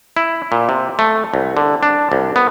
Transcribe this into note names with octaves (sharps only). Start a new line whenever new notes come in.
E4
A#2
C3
A3
C2
D3
D4
C2
B3